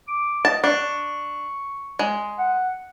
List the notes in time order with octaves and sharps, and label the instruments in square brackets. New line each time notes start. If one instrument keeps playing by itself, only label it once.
[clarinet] D6
[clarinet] D#5 [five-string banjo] A5
[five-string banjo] D4 [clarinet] C#6
[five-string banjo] G#3
[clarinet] F#5